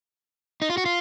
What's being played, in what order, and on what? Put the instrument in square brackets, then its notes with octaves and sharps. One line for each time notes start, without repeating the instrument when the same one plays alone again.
[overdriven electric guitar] D#4
F4
F#4
F4